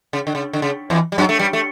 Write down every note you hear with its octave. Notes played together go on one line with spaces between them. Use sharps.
C#3
D3
C#3
D3
C#3
E2 E3
G3
F#2 F#3
A3
G2 G3
A3